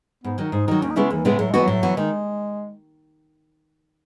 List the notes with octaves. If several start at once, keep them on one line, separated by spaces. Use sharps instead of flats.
G#2 B3
D#3 F#3
G#2 D#4
D#3 F#3 D#4
D#2 C#4
D#4
C#3 G#3 B3 C#4 E4
D#2 E3
A2 C#3 G#3 B3 E4
A2 F#3
E3 G#3 B3 F#4
A2 F#3
E3 B3 F#4
D#3 G#3